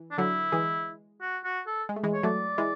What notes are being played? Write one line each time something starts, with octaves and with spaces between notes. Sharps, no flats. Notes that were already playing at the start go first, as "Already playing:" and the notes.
Already playing: E3
D4
D3 F#3 E4
E3 G#3
F#4
F#4
A4
G#3
A3
E3 G#3
C#5
F#3 A3 D5
E3 G#3